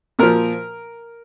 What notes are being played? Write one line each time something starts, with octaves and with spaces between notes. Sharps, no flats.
A#2 F3 A#4